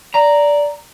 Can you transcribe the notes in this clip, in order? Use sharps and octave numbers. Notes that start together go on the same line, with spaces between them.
D5 A#5